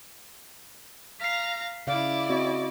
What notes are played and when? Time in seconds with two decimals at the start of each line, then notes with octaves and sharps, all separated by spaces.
1.20 F5 A#5 B6 C7
1.87 C#3 E4 D5 F5
2.30 C4 F#4 D#5